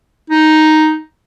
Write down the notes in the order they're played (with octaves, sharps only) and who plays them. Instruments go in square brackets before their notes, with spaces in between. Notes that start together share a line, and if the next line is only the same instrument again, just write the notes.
[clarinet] D#4